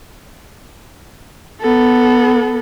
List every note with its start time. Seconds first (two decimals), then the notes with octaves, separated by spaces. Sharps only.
1.62 B3 A4